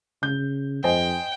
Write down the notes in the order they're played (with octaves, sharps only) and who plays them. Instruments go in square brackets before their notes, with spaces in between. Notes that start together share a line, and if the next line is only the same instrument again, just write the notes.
[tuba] C#3 [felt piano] G6
[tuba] F2 [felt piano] C5 D#5 G#5 [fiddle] G5